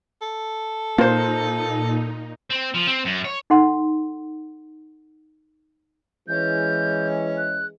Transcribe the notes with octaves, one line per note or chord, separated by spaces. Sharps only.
A4
A#2 A#3 D#4 F4 C5
C4
F3
C4
F#2
C#5
D#4 A4 F#5 C6
E3 G#3 C#4 G6
F#6